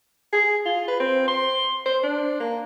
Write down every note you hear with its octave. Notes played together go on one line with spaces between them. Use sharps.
G#4
F4
B4
C4
C6
C5
D4
A#3